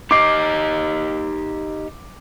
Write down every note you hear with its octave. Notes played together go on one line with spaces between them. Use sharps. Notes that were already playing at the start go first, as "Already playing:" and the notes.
D#4 G4 D#5 D6 C7